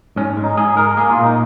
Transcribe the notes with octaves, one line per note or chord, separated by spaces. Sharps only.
G#2 C#4
G#3
D#4
G#2 G#4
G#3 A#4
A#3 G#4
F4
A#2
D#4